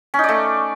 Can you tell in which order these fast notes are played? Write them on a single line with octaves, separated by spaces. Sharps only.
C#4 D#4 D5 A3